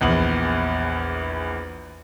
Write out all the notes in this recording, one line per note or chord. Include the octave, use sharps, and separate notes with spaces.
A#1 E2 F#7